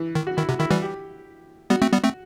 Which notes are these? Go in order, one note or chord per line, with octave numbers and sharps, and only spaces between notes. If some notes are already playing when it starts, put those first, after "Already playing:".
Already playing: E3
D#3
F#4
D#3 E4
C3 F#4
D#3 E4
E3 G3 F#4
G4
G3 B3 F#4
A3 C4
G3 B3
A3 C4